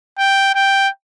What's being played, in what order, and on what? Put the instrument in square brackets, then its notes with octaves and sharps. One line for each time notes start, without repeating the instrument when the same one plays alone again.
[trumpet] G5
G5